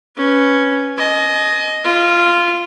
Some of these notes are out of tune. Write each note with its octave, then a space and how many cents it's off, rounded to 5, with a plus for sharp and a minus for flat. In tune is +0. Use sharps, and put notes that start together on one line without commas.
C#4 +0 B4 +0
D#5 +0 G#5 +40
F4 -10 F5 -45